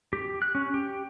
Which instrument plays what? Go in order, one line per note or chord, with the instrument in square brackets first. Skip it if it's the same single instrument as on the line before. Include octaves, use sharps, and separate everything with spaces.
[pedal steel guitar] G4
F#6
C#4
G4